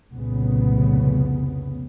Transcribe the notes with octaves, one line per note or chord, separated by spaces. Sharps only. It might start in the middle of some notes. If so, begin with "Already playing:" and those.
F1 C2 A#2 C#3 B3